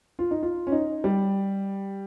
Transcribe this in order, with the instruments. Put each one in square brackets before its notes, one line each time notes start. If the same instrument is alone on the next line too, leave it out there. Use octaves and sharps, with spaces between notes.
[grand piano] F4
D#4
F4
C#4
D#4
G3